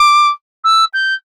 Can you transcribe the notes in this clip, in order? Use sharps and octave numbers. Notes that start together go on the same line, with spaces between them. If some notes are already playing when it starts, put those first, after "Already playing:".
Already playing: D6
E6
G6